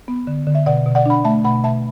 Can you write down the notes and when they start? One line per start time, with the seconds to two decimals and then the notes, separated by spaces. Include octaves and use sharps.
0.08 B3
0.27 D3
0.47 D3
0.55 E5
0.66 B2 D5 F#5
0.86 B2
0.95 D5 F#5
1.06 D4 F#5 B5
1.25 A3 E5 A5
1.44 B2 F#5 B5
1.64 B2 E5 A5